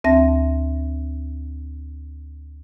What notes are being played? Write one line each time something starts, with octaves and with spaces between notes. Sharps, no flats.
D2 C4 E5 A5 A#6